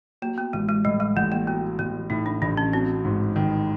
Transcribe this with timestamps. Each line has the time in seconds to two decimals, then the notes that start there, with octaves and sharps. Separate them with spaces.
0.22 F#3 A#3
0.38 B3
0.53 A1 G#3
0.69 G#3
0.85 A2 G3
1.00 G#3
1.16 A1 A3
1.32 A#3
1.47 F#3 B3
1.79 A1 B3
2.10 A2 D#4
2.26 D4
2.42 A1 D4
2.57 C#4
2.73 F#3 C4
3.05 G#2
3.36 D#3